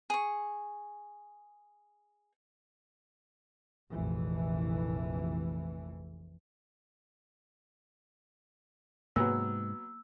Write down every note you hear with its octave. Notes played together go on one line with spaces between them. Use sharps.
G#4 C#6
F1 A#1 F2 E3
G#2 C3 F#3 G#3 A#3 B3 E6